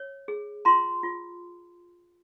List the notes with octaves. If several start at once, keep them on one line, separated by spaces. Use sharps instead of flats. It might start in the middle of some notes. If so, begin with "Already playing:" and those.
Already playing: C#5
G#4
F4 A#5 C6
F4